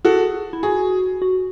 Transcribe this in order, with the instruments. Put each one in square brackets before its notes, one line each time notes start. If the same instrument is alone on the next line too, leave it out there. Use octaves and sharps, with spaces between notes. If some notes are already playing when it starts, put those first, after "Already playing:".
[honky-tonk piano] F#4 A4 [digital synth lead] G#4
[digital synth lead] E4
[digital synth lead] F#4 [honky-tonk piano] G#4
[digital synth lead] F#4